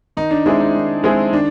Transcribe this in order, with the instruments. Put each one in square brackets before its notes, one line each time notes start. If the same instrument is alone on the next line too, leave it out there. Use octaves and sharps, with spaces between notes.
[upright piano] D#3 [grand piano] D#4
[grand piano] D4
[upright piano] G#3 C4 E4 G#4 [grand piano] D4
[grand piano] D#4
[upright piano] D#3
G#3 C4 E4 G#4
[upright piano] D#3 [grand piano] D4